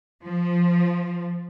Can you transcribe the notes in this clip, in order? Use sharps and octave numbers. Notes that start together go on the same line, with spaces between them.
F3